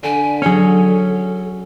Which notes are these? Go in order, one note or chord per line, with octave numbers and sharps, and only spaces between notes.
D3 G#5 B6 D7
F#3 C#4 G#4 A4 C#7